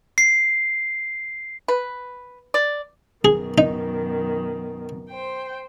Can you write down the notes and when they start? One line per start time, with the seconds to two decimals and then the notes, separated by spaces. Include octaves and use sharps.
0.18 C7
1.68 B4
2.54 D5
3.25 F#2 B2 D#3 G#4
3.58 D#4
5.09 C5 G5